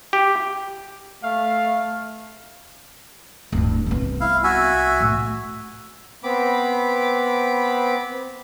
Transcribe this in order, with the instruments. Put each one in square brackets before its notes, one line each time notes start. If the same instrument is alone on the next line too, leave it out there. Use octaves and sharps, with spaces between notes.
[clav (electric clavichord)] G4
[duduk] A3 [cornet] F5
[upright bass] D1 G2
C2 B3
[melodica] E4 F5
F#4 E5 G#5
[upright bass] A2
[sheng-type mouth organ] B3 C4 B5 D6